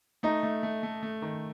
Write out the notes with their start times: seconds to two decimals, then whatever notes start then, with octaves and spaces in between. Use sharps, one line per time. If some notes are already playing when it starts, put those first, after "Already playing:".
0.23 A3 D#4
0.43 A3
0.63 A3
0.83 A3
1.03 A3
1.22 D#3